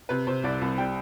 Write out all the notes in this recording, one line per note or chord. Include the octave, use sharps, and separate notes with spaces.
C3 B4
C3 C5
C2 D5
C2
G3 G5